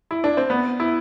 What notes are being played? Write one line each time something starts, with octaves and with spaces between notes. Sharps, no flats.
E4
D4
C4
B3
E4